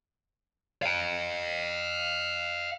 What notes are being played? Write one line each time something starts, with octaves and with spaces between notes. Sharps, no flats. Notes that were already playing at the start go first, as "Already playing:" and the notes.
F5 G5